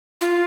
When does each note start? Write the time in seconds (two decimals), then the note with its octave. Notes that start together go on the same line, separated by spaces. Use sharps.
0.21 F4